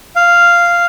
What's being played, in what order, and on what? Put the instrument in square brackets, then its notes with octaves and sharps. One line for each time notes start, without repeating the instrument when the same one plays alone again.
[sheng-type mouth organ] F5